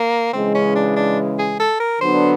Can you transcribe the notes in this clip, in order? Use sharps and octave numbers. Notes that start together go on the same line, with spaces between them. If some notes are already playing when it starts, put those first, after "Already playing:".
Already playing: A#3
C#3 E3 G#3 C4
C#4
D4
D4
G#4
A4
A#4
D3 F#3 B3 D4 C5